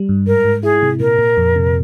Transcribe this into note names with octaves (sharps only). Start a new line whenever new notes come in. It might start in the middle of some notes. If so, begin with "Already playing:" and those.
Already playing: G3
G2
G#2 A#4
G#2
E4 G#4
C3
A#2 A#4
A#2
F2
C3